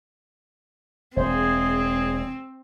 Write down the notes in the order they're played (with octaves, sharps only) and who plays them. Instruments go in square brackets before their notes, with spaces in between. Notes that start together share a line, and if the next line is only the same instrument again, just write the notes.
[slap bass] E1 [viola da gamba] C4 [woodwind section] G#4 [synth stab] C5